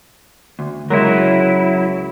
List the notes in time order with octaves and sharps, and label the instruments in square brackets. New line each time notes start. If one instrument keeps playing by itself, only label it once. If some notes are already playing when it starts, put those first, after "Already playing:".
[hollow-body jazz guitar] D2
[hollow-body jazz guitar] C#2 G#3 A#4 [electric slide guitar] F#3 E4